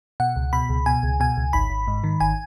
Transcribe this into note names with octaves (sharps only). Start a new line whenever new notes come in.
B2 F#5
C#2
B2 B5
C#2
B2 G#5
C#2
B2 G#5
C#2
G#1 B5
G#1
G#2
D#3
G#1 G#5